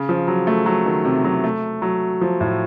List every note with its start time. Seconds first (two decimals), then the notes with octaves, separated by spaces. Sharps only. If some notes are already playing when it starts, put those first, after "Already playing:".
Already playing: C#3
0.09 F3
0.28 F#3
0.47 A3
0.66 F#3
0.86 D#3
1.05 C3
1.24 F#3
1.44 A3
1.82 F#3
2.21 F3
2.41 A2